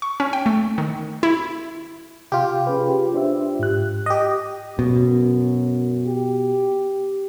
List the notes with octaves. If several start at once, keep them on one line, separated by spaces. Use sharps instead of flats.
C#6
C#4
G5
A3
D#3
E4
C3 F4 G4
C#4 G#4 B4
D4 C5 E5
G#2 F#6
G4 D#5
F#2 B2
G4